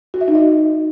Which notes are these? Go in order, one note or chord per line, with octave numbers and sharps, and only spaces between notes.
F#4
E5
D#4
D#5